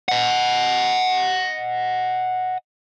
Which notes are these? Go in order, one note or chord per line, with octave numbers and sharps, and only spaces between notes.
D#5 F#5